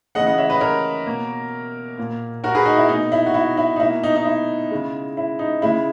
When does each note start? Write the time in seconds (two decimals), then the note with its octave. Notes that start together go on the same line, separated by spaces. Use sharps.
0.15 C#3 E3 G#3 D#5 F#5
0.26 D#5 F#5
0.38 C#5 E5
0.50 B4 D#5
0.61 A#4 C#5
1.06 B2 A#3
1.98 A#2 A#3
2.44 F#4 A#4
2.55 G#4 B4
2.66 D#4 F#4
2.78 E4
2.89 B2 A#3 D#4
3.12 E4
3.26 F#4
3.34 E4
3.57 E4
3.76 D#4
3.80 B2 A#3 E4
4.03 D#4
4.16 D#4
4.25 E4
4.71 C#3 G#3
5.17 E4
5.39 D#4
5.62 C#3 G#3 E4